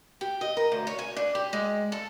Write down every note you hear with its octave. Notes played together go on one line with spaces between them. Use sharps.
G4
D#5
A#4
D2
C#5
G#5
D4
G4
G#3
A4